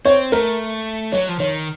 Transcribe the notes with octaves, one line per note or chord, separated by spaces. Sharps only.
C4 C#5
A3 A#4
F#3 C#5
F3
D#3 C#5